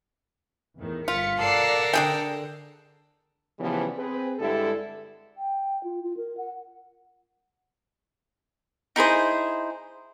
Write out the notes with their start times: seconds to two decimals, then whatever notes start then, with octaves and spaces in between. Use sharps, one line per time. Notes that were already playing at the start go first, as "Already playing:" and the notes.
0.78 E2 A2 D#3
1.08 G1 F4 B6 C#7
1.39 A4 A#4 D5 F#5 C7
1.93 D3 D4 G#4 G5
3.59 C#3 E3 F3 G3 B3
3.96 C4 G#4 B4
4.39 G2 D3 G#3 E4 G4 A4
5.37 G5
5.84 F4
6.03 F4
6.17 A#4
6.37 F#5
8.96 D#4 E4 G#4 C5